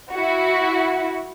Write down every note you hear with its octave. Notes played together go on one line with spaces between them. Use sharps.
E4 F#4